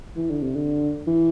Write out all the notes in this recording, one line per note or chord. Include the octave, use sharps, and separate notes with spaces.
E3
D3
C3
D3
E3